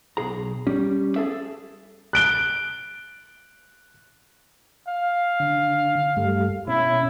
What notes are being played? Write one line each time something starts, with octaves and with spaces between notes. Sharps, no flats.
B1 G#4 A#5
G3 C#4
G#4 A4 E5
F#6 D7 G7
F5
D3
G2 G3 A3
B2 C#4 E4